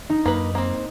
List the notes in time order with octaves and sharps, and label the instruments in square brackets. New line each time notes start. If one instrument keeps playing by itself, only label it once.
[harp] D#4
[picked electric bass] F#2 [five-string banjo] A#3 B4
[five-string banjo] A#3 C4